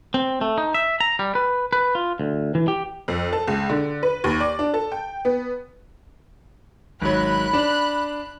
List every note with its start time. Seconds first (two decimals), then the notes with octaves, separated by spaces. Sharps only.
0.14 C4
0.41 A3
0.58 D#4
0.74 E5
1.00 A#5
1.19 G3
1.35 B4
1.73 B4
1.95 F4
2.20 D2
2.55 E3
2.68 G4
3.08 F2
3.33 A4
3.47 C#2
3.70 D3
4.03 B4
4.24 D#2
4.40 D5
4.59 D4
4.74 A4
4.92 G5
5.25 B3
7.02 G#1 F#3 B5 F#6
7.53 D4